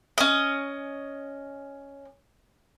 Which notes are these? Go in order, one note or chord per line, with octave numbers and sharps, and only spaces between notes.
C#4 D#5